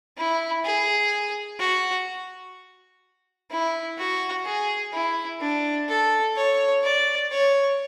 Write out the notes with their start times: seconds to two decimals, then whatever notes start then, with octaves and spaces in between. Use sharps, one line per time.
0.17 E4
0.65 G#4
1.60 F#4
3.51 E4
3.98 F#4
4.45 G#4
4.93 E4
5.40 D4
5.88 A4
6.36 C#5
6.83 D5
7.31 C#5